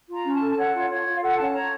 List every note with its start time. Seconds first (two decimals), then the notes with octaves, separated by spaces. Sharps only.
0.09 F4 A#5
0.24 C#4
0.34 A5
0.40 A4
0.51 A5
0.57 C#5 F#5
0.74 F4
0.89 F4 C#5
1.05 F4
1.16 F5
1.22 A4 F#5
1.38 C#4 A5
1.54 C#5 A#5